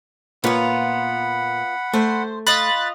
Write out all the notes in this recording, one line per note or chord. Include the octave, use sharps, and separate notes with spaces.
A#2 B3 F4 B4 C#5 F#5 B5
A3 C5
F4 D#5 B5 F#6 A6